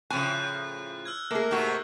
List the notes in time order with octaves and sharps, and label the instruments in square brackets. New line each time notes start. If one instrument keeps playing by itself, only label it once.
[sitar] A2 F3 [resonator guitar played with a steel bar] C#3 G#5 [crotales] F#6
[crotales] E6 F6 G#6
[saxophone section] A3 A#4 [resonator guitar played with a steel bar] A#3 G#4
[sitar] G#2 C3 F#4